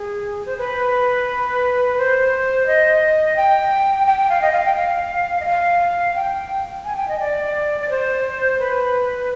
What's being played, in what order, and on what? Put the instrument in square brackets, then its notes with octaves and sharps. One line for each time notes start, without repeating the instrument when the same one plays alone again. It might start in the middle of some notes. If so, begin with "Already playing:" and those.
Already playing: [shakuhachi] G#4
C5
B4
C5
D#5
G5
G5
G5
F5
D#5
F5
G5
F5
D#5
F5
G5
G#5
G5
D#5
D5
D5
C5
B4